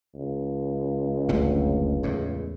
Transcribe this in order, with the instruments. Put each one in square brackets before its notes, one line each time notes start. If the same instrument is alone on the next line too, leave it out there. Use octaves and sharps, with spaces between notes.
[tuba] C#2
[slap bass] F#1 D2 C3
E2 A2